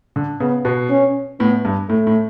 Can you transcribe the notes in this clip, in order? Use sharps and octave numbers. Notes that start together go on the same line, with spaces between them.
D3
C#3 B3
B2
C#4
A2 B3
G2
A2 A3
A2